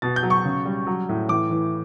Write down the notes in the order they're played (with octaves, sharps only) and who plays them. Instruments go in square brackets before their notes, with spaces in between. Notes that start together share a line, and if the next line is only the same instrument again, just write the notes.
[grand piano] B2 A6
G6
F#3
C#6
C#3
G3
F#3
A2
E3 D6
E3